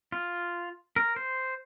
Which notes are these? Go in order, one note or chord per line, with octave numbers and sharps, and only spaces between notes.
F4
A#4
C5